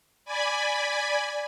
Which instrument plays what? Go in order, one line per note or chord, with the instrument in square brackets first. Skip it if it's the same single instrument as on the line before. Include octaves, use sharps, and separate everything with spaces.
[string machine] D5 G#5 B5